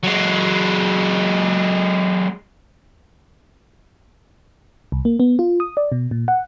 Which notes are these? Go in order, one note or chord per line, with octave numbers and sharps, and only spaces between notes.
F#3 G#3
C2
A#3
B3
F4
D#6
D5
B2
A#2
F#5